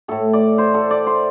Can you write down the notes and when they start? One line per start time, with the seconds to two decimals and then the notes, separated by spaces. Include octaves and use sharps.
0.08 A2 A3 A4
0.33 D5
0.58 C5
0.74 A4
0.91 D5
1.07 C5